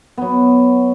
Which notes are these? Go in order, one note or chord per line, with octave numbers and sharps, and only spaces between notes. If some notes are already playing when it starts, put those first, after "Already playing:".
F#3 B3